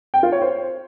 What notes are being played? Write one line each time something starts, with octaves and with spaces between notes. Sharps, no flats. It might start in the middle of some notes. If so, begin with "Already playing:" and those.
G5
F4
C#5
C5